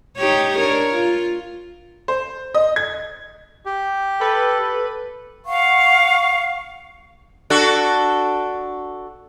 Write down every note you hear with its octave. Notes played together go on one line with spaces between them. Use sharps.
D#4 G4 C#5
D4 A#4 C#5
F4
C5
D#5
G#6
G4
A4 B4
F5 F#5 C#6
D4 F#4 A4